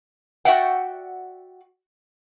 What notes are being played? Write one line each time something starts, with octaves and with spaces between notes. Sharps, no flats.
F#4 D5 E5 F#5 G5